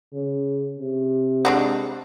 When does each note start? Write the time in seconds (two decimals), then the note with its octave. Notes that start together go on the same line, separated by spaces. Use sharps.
0.13 C#3
0.79 C3
1.45 G#3 D4 F#4